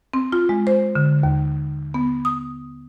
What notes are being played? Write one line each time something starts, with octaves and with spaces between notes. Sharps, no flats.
C4
F4
G#3
C5
D3
D#2
B3
D#6